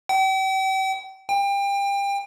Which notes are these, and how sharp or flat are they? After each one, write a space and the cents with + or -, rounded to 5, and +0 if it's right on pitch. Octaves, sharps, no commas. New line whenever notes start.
G5 -40
G5 +30